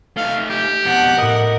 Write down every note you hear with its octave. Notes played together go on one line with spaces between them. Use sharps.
A3 D#4 F5
G4
F2 B2 F#5
A2 A#4 D#5